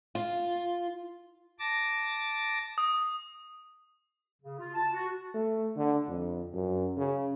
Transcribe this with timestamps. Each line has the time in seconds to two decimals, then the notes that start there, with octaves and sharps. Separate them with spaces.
0.15 F4
1.59 A5 D6 A#6
2.78 D#6
4.42 C#3
4.59 F4
4.75 A5
4.92 F#4
5.34 A3
5.76 D3
6.09 F2
6.53 F#2
6.97 C#3